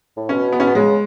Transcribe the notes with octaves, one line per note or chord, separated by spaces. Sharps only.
A2
B2 C#4
B3
C#4
B3
C#3 G#3